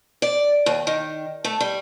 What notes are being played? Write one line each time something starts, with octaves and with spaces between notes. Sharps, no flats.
D5
D#2
D#3
A3
G3